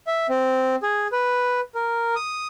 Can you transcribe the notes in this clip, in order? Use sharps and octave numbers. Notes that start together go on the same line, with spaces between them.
E5
C4
G#4
B4
A#4
D#6